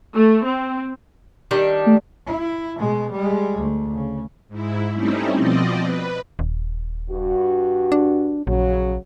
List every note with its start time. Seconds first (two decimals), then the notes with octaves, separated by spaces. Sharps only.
0.15 A3
0.45 C4
1.51 D#3 G3 D4
1.86 A3
2.26 E4
2.77 B2 G#3
3.11 G3 G#3
3.57 D2
3.94 C#3
4.49 G#2 E4
4.93 G3 A3 C4 C#4 D#4 E4
5.37 B2 F3 C4 D5 D#5
5.82 B4
6.39 D#1
7.10 G2 F#4
7.92 D4
8.47 A#1 C#3 F#3